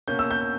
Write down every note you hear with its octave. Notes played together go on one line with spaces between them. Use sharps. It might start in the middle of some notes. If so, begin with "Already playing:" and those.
B2 A#3 C#4 G6
E6
G6